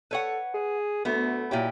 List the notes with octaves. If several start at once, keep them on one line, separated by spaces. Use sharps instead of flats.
A4 B4 C#5 F#5
G#4
D2 A3 B3
A#2 F#3 E4 G4